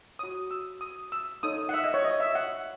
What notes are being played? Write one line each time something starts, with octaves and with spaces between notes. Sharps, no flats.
F#4 C#5 D#6
E6
D#6
E6
D#4 A4 C#5 D#6
F#5
E5
D#5
C#5
D#5
E5
F#5